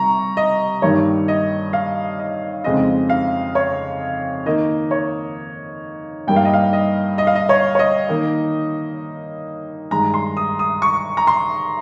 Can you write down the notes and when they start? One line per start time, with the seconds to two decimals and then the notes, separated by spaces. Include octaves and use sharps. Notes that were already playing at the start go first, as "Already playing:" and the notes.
Already playing: C3 G3 A#5 C#6
0.37 D#5
0.82 G2 D#3 G3 A#3 D#4 C#5
1.28 D#5
1.73 F5
2.19 D#5
2.64 F2 C#3 G#3 C4 D#4 D#5
3.10 F5
3.55 C#5
4.46 D#3 A#3 D#4 D#5
4.91 C#5
6.27 G2 G3 A#3 D#4 G5
6.36 F5
6.45 D#5
6.54 F5
6.73 D#5
7.18 D#5
7.27 F5
7.35 D#5
7.49 C#5
7.75 C#5
7.79 D#5
8.09 D#3 A#3 D#4
9.91 G2 D#3 G#3 A#5
10.14 C6
10.37 D#6
10.59 D#6
10.82 C#6
11.17 A#5
11.27 C6